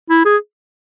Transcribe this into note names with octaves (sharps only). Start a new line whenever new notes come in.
E4
G#4